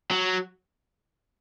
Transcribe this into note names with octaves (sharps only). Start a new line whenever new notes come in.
F#3